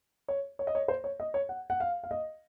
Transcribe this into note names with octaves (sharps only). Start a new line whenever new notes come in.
C#5
C#5
D#5
C#5
C5
C#5
D#5
C#5
F#5
F#5
F5
F5
D#5